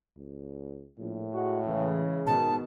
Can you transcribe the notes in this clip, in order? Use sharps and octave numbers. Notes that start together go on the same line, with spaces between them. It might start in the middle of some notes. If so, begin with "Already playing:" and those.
C#2
A#1 A2
G#3 F#4
C#3 E3 G#3
G#2 B2 D#3 A5